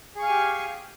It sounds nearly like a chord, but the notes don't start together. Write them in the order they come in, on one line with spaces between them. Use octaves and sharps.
G#4 C#6 F5 G#5 G4